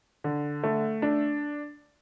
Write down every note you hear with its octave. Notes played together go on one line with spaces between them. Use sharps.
D3
A3
D4